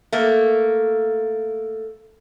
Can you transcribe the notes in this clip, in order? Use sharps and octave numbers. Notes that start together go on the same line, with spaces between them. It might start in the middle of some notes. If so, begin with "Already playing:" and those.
A3 A#3